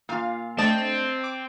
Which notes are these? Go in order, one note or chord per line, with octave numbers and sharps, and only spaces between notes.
A#2 F4 F5
A3 C4 D4 D#5 A5
D6